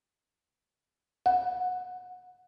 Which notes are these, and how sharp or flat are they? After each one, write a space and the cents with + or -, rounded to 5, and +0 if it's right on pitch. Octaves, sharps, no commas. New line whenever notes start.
F#5 -25